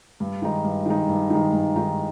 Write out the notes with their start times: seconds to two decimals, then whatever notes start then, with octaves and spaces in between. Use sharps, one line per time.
0.20 G2
0.42 D#3 G#3 D#4
0.64 G2
0.86 D#3 G#3 D#4
1.09 G2
1.30 D#3 G#3 D#4
1.53 G2
1.75 D#3 G#3 D#4